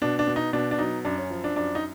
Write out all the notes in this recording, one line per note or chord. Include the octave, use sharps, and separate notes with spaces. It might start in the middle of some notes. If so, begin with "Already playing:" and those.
B2 D4
D4
B2
D#4
B2 D4
D4
F#3 D#4
F#2 D4
C#4
F3
D4
F#2 D4
D#4